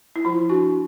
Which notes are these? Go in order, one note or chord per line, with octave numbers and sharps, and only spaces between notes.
E4
F3 F4
D4 F#4